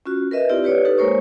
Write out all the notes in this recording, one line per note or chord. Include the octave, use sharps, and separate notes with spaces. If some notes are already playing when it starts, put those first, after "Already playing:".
C#4 F4 F#4
A#4 B4 D#5 E5
C4 E4 F4 G4 D5
G4 B4 C#5 D5
D#4 G4 A4 B4
G#3 A#3 A#4 C5 C#5 C#6